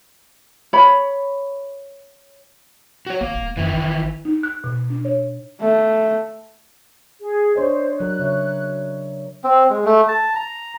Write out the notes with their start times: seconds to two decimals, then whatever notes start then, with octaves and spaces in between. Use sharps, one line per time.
0.73 C#5 B5
3.06 F#4 C#5
3.21 G#1 A#3
3.35 D#1
3.57 F#2 D#3 E3
3.74 G#1
4.25 D#4
4.43 F#6
4.64 B2
4.90 D4
5.05 C#5
5.61 A3
7.21 G#4
7.56 D4 C5 C#5 D#5
8.00 F#3 A#4 F#6
8.19 C#3 C#5 E5
9.44 C4
9.70 G#3
9.85 A3
10.08 A5
10.35 A#5